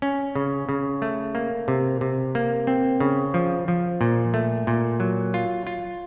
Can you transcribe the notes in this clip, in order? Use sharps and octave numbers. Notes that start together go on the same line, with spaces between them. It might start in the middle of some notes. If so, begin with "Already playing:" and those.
C#4
C#3
C#3
A3
A#3
C3
C3
A#3
C4
C#3
F3
F3
A#2
A3
A#2
F#3
F4
F4